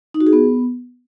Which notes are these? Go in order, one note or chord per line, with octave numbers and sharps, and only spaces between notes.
D#4
F#4
G#4
B3